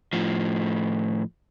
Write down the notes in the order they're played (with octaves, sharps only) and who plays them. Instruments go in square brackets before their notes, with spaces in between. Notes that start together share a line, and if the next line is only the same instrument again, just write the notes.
[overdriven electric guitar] A2 F3